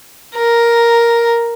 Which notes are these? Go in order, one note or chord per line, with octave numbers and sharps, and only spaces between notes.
A#4